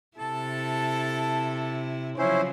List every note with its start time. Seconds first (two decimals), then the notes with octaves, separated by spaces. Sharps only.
0.18 C3 E4 A4 A5
2.18 C#3 F3 F#3 C#4 E4 C5 C#5